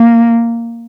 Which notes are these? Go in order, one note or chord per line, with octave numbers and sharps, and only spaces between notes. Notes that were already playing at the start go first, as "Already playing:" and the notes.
Already playing: A#3